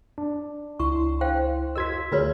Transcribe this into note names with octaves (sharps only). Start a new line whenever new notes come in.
D4
C#2 E4 C6 C#6
C5 F5 G5
F#4 A#4 D#5 E6 G#6 B6
D2 F4 G#4 A#4 B4 C#5